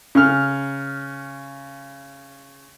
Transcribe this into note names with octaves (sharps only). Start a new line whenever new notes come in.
C#3 F6